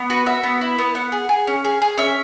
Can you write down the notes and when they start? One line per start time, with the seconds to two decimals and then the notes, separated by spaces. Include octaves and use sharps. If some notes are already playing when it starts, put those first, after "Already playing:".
Already playing: B3
0.10 F#4 B4
0.26 F#4 E5
0.43 B3
0.61 E4
0.78 B3
0.95 B3 F#5
1.12 G#4
1.29 G#4
1.47 C#4
1.64 G#4
1.82 G#4
1.98 C#4 E5